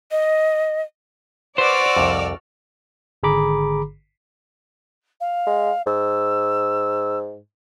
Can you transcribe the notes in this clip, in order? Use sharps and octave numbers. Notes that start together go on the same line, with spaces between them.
D#5
F#4 B4 C5 D5 D6 E6 F6
C2 F2
G#1 D3 G#4 A#5 B5 D6
F5
G#3
G#2 E6